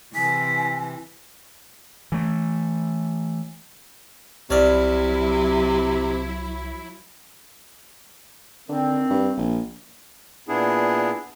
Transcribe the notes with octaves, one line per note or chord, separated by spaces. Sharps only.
C3 E3 G#5 B6
E3 A3
C2 C3 F#3 E4 C#5 D5 F6
D3 D#3 C4
G2
A#1
A#2 B3 D4 E4 G#4